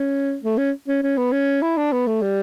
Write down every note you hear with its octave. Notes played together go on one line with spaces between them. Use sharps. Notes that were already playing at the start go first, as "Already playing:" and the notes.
Already playing: C#4
A3
C#4
C#4
C#4
B3
C#4
E4
D4
B3
A3
G3